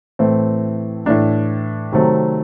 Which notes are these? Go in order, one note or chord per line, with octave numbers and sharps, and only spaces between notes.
A2 E3 A3 C4
A2 E3 A3 D4
C3 D#3 F#3 A3 C4